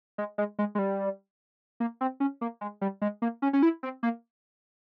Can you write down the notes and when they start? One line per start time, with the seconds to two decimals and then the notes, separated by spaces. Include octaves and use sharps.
0.18 G#3
0.38 G#3
0.59 G#3
0.75 G#3
0.79 G3
1.80 A#3
2.01 C4
2.20 C#4
2.41 A#3
2.61 G#3
2.81 G3
3.02 G#3
3.22 A#3
3.42 C#4
3.53 C#4
3.63 E4
3.83 C4
4.03 A#3